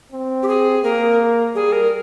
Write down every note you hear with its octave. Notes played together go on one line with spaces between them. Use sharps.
C4
G4
G#4
A#3 A#4
G3 G#4
A#4